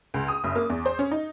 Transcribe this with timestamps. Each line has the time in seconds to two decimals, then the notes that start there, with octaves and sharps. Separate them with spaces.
0.14 C#2
0.28 D#6
0.44 F#1
0.56 A#3
0.70 E2
0.86 C5
0.99 C#4
1.11 D#4